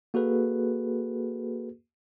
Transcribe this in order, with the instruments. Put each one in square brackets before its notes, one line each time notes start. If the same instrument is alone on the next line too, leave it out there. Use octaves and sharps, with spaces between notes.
[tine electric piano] A#3 F#4 G#4 A4 B4